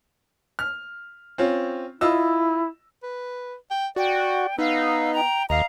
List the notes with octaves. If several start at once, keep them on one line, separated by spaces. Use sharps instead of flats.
F6
C4 C#4 F4
E4 F4 D#5 E6
B4
G5
F#4 D5 G5
B3 D#4 F5 E6
G5 A#5
D#2 D#5 F5 A#5